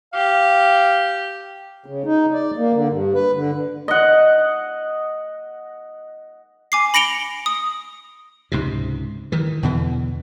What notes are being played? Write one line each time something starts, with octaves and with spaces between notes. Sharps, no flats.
G4 F5
C#3
D#4
D5
A#3
D3
G2
B4
D3
D#5 F#5
G#5 D6 C7
B5 A#6 C#7 D7 F7 G7
D#6
C#2 G#2 C3
D#3 E3
E2 B2 D3 E3